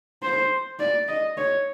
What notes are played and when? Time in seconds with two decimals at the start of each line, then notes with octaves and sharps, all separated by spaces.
0.23 C5
0.79 D5
1.08 D#5
1.37 C#5